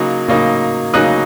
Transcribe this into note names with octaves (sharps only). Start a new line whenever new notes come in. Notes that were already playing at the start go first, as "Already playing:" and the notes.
Already playing: C#3 F#3 A#3 D#4
C#3 F#3 A#3 D#4
C#3 F#3 A#3 D#4 D#6 F#6